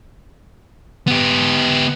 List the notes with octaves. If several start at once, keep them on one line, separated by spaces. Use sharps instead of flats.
B3 G4